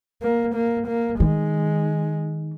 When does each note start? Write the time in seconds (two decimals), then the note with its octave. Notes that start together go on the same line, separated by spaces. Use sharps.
0.22 A#3
0.55 A#3
0.87 A#3
1.19 D#3 G#3